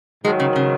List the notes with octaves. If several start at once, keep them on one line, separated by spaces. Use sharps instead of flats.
G#2 D#3 F#3 G#3
C#3
C#3